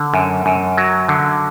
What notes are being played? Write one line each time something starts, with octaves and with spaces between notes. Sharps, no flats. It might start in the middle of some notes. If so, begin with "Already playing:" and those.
Already playing: D3
F#2
F#2
F#3
D3